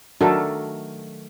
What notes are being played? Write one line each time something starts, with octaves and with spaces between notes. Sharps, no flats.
D#3 F#3 A3 D4 A4 A#4